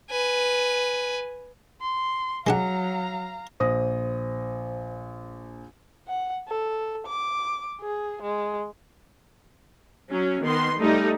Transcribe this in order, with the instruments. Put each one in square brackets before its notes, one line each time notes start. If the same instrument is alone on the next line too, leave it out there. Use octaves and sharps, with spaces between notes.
[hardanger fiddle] B4 G#5
[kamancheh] C6
[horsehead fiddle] F#3 [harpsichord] G#3 D4 F#5 [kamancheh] F5 A#5
[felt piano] A#1 D#6 A#6 [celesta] C5
[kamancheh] F#5
A4
D6
G#4
G#3
[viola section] F#3 C#4
D#3 B3 C6
G3 A3 D#4